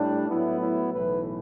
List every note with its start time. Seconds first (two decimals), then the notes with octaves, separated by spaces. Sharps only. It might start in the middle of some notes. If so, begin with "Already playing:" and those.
Already playing: A2 G3 D4
0.29 A2 F#3 B3 E4
0.61 E4
0.92 B1 A2 E3 B4